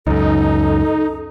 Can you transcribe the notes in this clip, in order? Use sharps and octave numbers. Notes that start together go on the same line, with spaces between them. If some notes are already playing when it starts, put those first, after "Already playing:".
C#2 F#2 D#4 A4